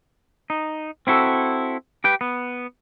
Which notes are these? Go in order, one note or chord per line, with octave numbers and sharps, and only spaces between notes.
D#4
C4 E4 F#4 A4
G4 B4 G5
B3